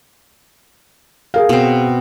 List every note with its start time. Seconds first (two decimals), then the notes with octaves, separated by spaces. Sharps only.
1.34 G#4 A#4 F5
1.49 B2 C4